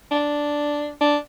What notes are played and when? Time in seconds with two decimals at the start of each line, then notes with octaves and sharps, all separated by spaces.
0.11 D4
1.01 D4